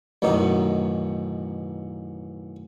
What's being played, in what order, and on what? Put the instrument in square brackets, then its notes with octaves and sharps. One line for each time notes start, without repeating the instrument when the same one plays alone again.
[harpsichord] A1 F#2 B2 D#3 D#4